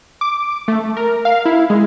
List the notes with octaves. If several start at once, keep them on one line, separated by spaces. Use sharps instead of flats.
D6
A3
A#4
F5
E4
G#3